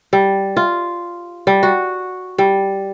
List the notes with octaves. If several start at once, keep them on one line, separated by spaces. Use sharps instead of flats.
G3
F4
G3
F#4
G3